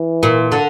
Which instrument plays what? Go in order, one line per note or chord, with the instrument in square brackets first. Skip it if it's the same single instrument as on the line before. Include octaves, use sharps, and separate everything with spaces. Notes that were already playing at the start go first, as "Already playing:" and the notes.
Already playing: [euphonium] E3
[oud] A#2
D3